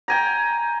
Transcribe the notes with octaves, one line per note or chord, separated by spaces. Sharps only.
G5 G#5 A#5